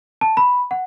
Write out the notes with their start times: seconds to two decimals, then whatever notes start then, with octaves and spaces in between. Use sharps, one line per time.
0.21 A5
0.37 B5
0.71 F#5